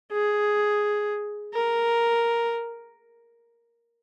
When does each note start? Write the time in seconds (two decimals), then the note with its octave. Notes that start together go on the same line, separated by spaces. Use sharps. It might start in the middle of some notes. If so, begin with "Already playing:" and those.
0.12 G#4
1.53 A#4